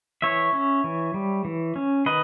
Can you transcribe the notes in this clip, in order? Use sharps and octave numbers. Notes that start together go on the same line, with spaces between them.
E3 C#5 E5
C#4
E3
G3
E3
C#4
D#3 B4 D#5